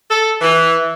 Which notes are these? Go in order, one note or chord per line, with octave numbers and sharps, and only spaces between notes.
A4
E3